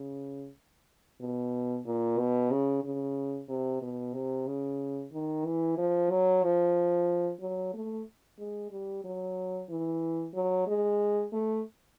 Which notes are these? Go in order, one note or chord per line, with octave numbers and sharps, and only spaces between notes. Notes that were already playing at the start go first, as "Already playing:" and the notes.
Already playing: C#3
B2
A#2
B2
C#3
C#3
C3
B2
C3
C#3
D#3
E3
F3
F#3
F3
F#3
A3
G#3
G3
F#3
E3
F#3
G#3
A3